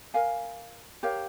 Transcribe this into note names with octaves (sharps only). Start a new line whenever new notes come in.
A#4 F5 G#5
G4 A#4 C#5 F5